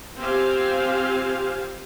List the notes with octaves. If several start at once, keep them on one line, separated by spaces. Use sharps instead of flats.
C4 F4 G4 C5 F5 G#5